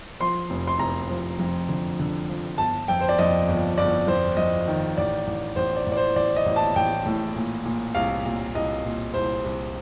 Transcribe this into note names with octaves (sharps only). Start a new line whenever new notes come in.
F3 C6
F1
C6
F1 A#5
F3
F2
D3
D3
F3
G1 A5
F2 G5
C5
D5
F2 D#5
G1
G1 D5
F2 C5
F2 D#5
D#3
A1 D5
A1
A1 C5
D5
A1
D5
C5
A1 D5
D#5
A1
A5
A1 G5
A2
A#2
A#2
C2 F5
A#2
C2 D#5
A#2
C2 C5
C2